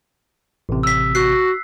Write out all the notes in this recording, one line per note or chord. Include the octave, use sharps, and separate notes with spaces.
A1 C3
E6 B6
F#4 F#6 C7